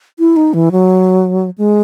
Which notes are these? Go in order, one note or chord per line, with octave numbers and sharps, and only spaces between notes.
E4
D#4
E3
F#3
G#3